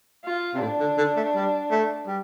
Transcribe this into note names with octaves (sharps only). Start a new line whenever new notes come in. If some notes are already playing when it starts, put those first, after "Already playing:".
F4
C3
A2 D4
D3
D3
A3
G3
A3
G3